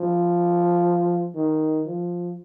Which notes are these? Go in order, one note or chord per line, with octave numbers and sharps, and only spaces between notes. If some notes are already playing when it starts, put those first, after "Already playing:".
Already playing: F3
D#3
F3